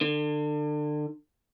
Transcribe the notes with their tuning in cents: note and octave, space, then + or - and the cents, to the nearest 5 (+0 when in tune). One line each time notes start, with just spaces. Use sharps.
D3 +30